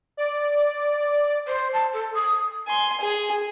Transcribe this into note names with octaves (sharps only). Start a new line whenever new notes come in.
D5
C5
A5
A4
D#6
G#5 C6
G#4